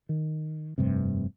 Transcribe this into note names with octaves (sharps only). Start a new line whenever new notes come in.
D#3
F1 G2 C3